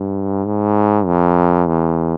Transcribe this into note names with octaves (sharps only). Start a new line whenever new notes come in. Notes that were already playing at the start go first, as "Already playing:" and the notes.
Already playing: G2
G#2
F2
E2